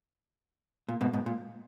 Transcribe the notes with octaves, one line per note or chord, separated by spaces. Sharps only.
A#2
G#2 B2
G#2 B2
A#2